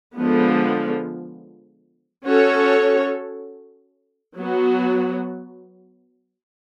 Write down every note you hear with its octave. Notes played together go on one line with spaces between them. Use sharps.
D3 F3 G#3 B3
C#4 F#4 A4 C#5
F#3 B3 F#4